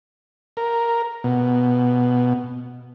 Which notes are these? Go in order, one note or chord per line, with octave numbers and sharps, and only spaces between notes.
A#4
B2